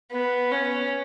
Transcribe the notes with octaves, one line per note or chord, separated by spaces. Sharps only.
B3
C#4